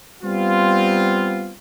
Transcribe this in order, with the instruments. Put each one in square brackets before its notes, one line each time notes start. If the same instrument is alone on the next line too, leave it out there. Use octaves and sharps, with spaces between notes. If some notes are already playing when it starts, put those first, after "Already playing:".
[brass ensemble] G3 B3 C4 F4